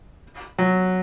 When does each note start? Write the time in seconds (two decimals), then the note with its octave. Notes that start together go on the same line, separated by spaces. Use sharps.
0.58 F#3